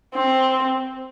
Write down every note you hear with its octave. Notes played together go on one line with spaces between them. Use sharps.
C4